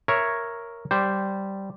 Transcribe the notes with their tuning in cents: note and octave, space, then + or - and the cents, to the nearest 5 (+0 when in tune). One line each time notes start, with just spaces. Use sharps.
A#4 +0 C#5 -5 E5 +10
G3 -10 C5 -5